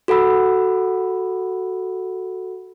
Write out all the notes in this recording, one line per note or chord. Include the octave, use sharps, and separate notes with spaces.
F#4 A4 F#5 B5 E6